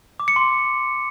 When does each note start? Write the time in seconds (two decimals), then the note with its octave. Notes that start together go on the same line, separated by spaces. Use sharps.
0.20 D6
0.28 C#7
0.36 C6